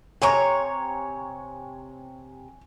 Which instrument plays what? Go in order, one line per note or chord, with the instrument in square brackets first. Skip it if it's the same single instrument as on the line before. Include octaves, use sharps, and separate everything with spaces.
[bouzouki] C3 C#5 A#5 [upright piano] G#5 C#6